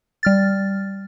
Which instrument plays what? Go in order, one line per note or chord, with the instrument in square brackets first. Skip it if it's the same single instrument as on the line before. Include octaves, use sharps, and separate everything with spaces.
[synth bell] G3 F6 A6